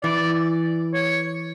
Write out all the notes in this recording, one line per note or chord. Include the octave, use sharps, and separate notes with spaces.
E3 D5
C#5